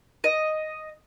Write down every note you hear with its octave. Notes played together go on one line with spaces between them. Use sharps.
D#5